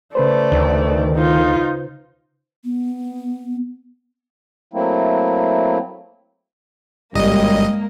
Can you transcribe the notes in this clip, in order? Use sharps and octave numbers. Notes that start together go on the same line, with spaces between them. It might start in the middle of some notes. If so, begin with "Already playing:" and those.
C#3 A3 B4 C5 D5
D2 D#3
D#4 F4
B3
F#3 A3 A#3 C4 E4
G1 F#2 G3 G#3 A#3 D#5